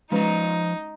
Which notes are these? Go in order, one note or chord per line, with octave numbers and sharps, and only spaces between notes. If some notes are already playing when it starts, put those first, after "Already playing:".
F3 G#3 C#4 D#4 B4 A#5